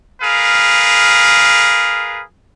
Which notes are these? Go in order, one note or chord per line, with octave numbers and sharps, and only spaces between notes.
G#4 A#4 B4 F5